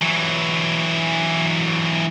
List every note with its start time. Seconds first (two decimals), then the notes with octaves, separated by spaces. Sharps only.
0.02 E3 F#3